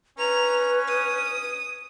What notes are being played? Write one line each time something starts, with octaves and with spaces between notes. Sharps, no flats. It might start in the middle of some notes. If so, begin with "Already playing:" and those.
C#4 B4 A#5 F7
D#6